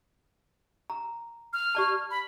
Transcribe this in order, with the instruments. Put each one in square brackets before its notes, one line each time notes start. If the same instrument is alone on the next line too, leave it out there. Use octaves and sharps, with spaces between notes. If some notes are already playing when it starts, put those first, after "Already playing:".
[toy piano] A#5
[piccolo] F6
[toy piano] G4 D5 A5
[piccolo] B5